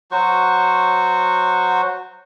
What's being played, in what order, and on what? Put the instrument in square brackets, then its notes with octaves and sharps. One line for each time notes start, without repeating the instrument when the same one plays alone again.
[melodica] F#3 F#4 C5 C#6